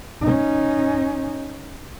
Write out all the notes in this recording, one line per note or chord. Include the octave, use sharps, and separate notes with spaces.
C#4 D#4